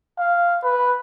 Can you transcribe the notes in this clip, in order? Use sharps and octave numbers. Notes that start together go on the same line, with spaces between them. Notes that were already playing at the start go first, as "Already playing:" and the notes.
F5
B4